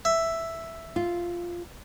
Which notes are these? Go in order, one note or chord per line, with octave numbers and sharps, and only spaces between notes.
E5
F4